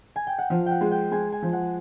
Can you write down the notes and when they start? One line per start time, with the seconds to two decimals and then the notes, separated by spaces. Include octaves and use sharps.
0.16 G#5
0.27 G5
0.39 F#5
0.50 F3 F5
0.66 F#5 G5
0.81 G#3
0.91 G5
1.11 G#3 G#5
1.32 G#5
1.42 F3
1.53 F#5